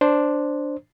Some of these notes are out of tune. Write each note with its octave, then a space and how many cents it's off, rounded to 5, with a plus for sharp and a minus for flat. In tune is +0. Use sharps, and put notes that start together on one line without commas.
D4 +0 C5 +0